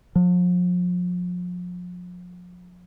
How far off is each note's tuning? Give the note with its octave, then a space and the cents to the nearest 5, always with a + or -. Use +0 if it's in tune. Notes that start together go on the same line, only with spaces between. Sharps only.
F3 +40